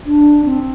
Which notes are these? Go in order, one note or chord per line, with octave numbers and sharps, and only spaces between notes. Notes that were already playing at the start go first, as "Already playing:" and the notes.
D4
C4